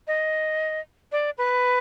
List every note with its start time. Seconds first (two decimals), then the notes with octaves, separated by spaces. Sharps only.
0.07 D#5
1.12 D5
1.38 B4